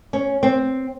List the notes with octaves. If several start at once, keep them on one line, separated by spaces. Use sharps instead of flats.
C#4
C4